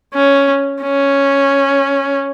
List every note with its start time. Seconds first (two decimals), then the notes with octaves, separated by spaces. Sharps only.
0.14 C#4
0.82 C#4